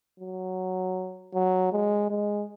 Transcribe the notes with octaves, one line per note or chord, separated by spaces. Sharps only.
F#3
F#3
G#3
G#3